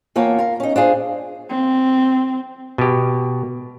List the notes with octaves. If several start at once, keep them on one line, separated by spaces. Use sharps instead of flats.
E2 A#3 F4 C#5 G5 A5
F4 A#4
C#4 D#4
D4 F4 G#4 C5
C4
B2 G4